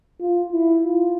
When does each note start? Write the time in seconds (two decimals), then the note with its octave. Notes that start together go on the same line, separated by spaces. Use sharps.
0.20 F4
0.52 E4
0.83 F4